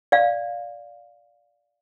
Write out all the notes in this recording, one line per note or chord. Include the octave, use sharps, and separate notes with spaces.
D5 F5